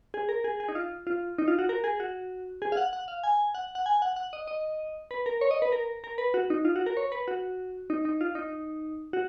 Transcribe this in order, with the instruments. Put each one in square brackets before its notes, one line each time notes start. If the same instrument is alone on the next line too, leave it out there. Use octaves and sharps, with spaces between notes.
[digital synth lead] G#4
A#4
G#4
G#4
D#4
F4
F4
D#4
F4
F#4
A#4
G#4
F#4
G#4
F5
F#5
F#5
F5
G#5
F#5
F#5
G#5
F#5
F#5
D#5
D#5
B4
A#4
C#5
D#5
B4
A#4
A#4
B4
F#4
D#4
F4
F#4
A#4
C#5
B4
F#4
D#4
D#4
F4
D#4
F#4